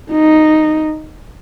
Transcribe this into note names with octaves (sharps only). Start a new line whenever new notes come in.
D#4